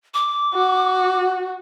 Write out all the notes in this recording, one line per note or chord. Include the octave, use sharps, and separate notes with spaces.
D6
F#4